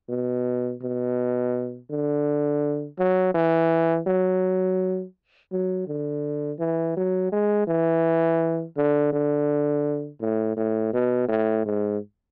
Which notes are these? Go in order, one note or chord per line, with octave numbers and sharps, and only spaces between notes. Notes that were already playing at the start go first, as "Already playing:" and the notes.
B2
B2
D3
F#3
E3
F#3
F#3
D3
E3
F#3
G#3
E3
D3
D3
A2
A2
B2
A2
G#2